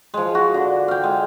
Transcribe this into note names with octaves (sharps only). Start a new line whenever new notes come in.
F3 G#3
F#4
D3
F5 G5
G#3